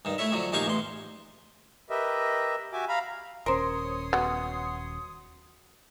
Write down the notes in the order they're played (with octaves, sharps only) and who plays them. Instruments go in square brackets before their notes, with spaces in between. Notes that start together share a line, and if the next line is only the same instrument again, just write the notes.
[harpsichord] G2 D#3
A3 E4 C#5 E5
F2 D3 F#3
A#1 D#3 G4 F5 G#5 C#6
A1 E2 C6
[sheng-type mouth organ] G4 A#4 B4 D#5 E5
F#4 G4 E5 G#5 D6
F5 A#5 B5
[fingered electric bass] D#1 C#4 [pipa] A#4 C5 [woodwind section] C#5 C6 D#6
[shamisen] F#3 B3